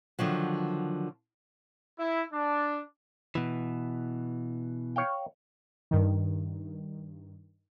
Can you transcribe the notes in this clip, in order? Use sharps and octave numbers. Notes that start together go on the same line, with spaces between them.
D3 D#3 F3 F#3
E4
D4
B2 E3
C#5 F5 G5
G2 D#3